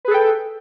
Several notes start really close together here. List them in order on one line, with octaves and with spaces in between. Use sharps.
B4 G#4 A4 G5